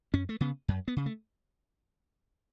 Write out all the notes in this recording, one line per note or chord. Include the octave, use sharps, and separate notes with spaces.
F#2 C#4
A3
C#3 B3
F#2
B3
C#3
A3